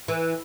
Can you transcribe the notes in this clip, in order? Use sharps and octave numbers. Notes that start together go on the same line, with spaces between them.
E3